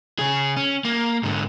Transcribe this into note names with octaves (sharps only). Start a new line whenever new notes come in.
C#3 G#4
C#4
A#3
G#2 D3